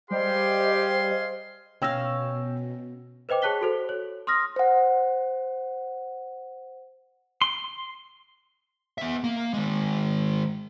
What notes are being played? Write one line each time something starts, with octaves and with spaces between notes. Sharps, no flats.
G3 G4 G#4 C5 D#5 F5 C6
B2 C#4 F5 G5 E6 A#6
B4 C5 D#5 G5 D6
G#4 C#5 A5 F#6 B6 G7
F#4 A4 C5
C#5
C6 D#6 F6 A#6
C5 F#5
C6
B3 E5
A#3
D#3 G#3